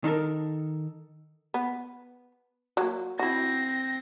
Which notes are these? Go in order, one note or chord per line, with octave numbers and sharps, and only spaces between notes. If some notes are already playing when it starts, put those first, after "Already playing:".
D#3 D#4 A4 A#4
B3
F#3 A#3
C4 E4 F#4 A#6